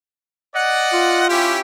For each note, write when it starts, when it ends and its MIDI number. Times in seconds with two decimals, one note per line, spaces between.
0.55 1.24 74
0.55 1.24 75
0.55 1.24 78
0.93 1.57 65
1.29 1.59 61
1.29 1.59 64
1.29 1.59 67